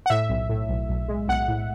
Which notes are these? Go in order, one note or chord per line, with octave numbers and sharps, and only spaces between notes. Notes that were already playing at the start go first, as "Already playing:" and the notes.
F#5
A2 E5
B1
A2
B1
B1
G#3
B1 F#5
A2